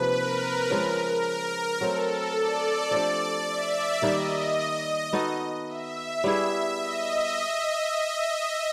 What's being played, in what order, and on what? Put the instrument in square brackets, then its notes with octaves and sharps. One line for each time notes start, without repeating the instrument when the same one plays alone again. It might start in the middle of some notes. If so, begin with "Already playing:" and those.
Already playing: [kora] C3 F3 A#3 D#4 [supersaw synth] B4
[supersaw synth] A#4
[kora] C#3 F3 G#3
[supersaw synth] A#4
[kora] F#3 A3 C4 [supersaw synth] A4
[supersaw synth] D5
[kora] F3 A3 D4 G4
[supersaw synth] E5
[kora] D#3 G3 A#3 [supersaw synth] D#5
[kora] B3 D#4 F#4 A4
[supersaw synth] E5
[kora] G3 B3 E4 G#4
[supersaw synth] D#5